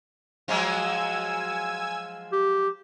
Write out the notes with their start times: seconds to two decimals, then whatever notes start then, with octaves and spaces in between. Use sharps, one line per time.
0.48 F3 F#3 G#3 G#5 E6 G#6
2.32 G4